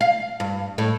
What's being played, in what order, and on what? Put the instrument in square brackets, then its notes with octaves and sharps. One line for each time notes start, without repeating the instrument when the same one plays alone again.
[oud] F5
G2
A2